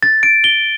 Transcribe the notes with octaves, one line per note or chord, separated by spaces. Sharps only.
A6
D7
G7